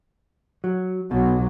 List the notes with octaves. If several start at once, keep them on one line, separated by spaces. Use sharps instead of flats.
F#3
B1 B2 F#3